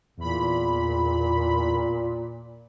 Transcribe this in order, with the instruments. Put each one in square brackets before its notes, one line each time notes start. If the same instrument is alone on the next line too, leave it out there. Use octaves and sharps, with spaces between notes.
[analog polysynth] E2 B5 [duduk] A#2